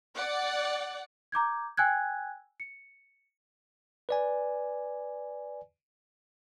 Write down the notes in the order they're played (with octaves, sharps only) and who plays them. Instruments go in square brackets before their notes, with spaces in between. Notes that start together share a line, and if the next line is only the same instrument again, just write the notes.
[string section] D5 F#5
[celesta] A#5 D6 G6 G#6
G5 G#5 E6 F#6 G#6
C#7
[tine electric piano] B4 D5 G#5